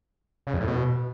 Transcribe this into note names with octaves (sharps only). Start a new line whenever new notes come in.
C#3
F2
A2
B2